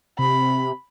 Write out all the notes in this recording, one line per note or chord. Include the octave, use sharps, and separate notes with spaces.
C3 B5